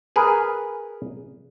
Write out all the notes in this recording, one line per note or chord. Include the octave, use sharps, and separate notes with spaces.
G#4 A#4 B4